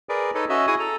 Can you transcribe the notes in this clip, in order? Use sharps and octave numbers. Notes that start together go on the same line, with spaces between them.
G#4 A#4 B4 D5
D#4 A4 B4 C#5 D#5
C#4 F#4 D#5 E5
E4 F#4 G#4 G#5 C#6 D#6
A4 A#5